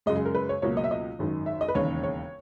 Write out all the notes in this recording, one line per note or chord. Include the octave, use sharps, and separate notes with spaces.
F#2 C#3 G#3 D#5
G#4
A#4
B4
C#5
C#2 B2 F#3 A#3 C#5
D#5
E5
D#5
G#1 F#2 D#3
E5
D#5
B4
E1 D#2 C#3 C#5
C#5